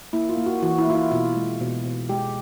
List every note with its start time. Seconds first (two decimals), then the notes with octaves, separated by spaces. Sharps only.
0.13 A#3 E4
0.29 F4
0.38 A#3
0.46 F#4
0.62 E3 F#4
0.78 E4
0.87 A#3 F4
0.95 E4
1.12 B2 F4
1.36 G#3
1.60 B2
1.85 B2
2.09 G#3 G4